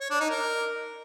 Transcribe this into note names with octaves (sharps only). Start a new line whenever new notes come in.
C#5
D4
D#4
A#4